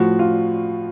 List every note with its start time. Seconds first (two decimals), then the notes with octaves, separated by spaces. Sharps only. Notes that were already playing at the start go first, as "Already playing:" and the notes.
Already playing: A2 F3 F#4
0.19 F4